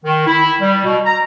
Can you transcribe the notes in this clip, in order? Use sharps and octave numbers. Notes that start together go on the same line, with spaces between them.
D#3
E4
G3
B2
A#5